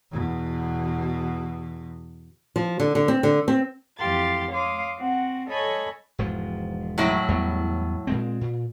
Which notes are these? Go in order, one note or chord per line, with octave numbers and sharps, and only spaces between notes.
E2 B2
F3
D3
D3
C4
D3
C4
F2 E3 G4 F5 C6 A6
C#5 F5 C6 D6 D#6
C4 F#4 F#5
A4 C#5 D#5 G#5 B5 C#6
E1 G#2 F3
A2 F#3 E4
E2 G3 B3
A#2 G#3 C4
A#2